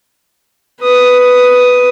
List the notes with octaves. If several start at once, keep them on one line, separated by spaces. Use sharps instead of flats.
B4 D#6